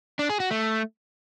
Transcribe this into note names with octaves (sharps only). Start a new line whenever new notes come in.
D4
G#4
F#4
A3